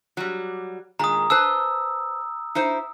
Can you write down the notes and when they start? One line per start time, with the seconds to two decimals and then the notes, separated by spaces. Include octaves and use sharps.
0.17 F#3 G3
0.99 A#2 D#3 G#3 A#5 D#6
1.30 B4 C5 A5 E6
2.55 D#4 E4 C5